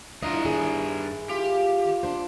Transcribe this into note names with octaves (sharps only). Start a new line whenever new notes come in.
G2 D4 E4 F4 D#5 A#5
D#3 G#4
F4 G4
D4 C5